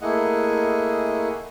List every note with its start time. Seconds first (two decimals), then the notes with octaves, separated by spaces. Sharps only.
0.01 A3 A#3 E4 G#4 D#5 F#5